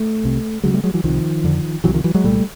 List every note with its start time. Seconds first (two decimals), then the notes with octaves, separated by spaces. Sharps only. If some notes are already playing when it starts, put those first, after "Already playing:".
Already playing: A3
0.24 C2 C3
0.64 D2 C#3 F#3 G#3
0.74 G3 A3
0.84 F#3 G#3
0.94 E3 F#3
1.04 C2 C3 D#3 F3
1.44 F2 D3
1.84 C2 C3 E3 F#3
1.94 D#3 F3
2.04 E3 F#3
2.14 F#3 G#3
2.24 C2 A#2 G3 A3